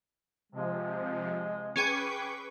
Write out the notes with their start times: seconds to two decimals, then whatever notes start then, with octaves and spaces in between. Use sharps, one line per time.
0.52 C3 F3 G#3
1.76 C#4 G#4 B4 G5 C#6 D6